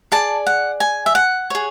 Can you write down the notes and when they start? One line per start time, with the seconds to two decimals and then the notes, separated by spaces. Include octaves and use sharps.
0.12 G#4 D5 A5
0.47 F#5
0.80 G#5
1.06 E5
1.15 F#5
1.50 G#4 C#5